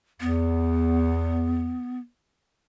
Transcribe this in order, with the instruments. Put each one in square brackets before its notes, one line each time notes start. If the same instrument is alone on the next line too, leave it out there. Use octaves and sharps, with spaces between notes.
[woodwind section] E2 [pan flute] B3